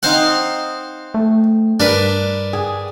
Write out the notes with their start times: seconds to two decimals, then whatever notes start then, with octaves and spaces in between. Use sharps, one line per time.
0.03 C4 D#4 C5 F5 F#5
1.14 A3
1.80 G2 D4 A#4 B4
2.53 G#4